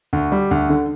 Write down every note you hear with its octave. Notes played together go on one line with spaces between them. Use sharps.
D2
G3
D2
D3